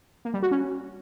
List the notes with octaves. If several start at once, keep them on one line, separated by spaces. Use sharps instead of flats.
A#3
G3
F#4
C#4